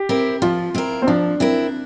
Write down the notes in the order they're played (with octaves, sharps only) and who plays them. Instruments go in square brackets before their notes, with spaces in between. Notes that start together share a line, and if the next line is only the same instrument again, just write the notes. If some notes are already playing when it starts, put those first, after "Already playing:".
Already playing: [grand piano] G4
[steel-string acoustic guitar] C4 E4 A#4
[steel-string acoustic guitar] F3 [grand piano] F4
[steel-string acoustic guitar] C4 E4 A#4
[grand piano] C4
[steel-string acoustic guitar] F3 [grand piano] D4
[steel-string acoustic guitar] C4 E4 A#4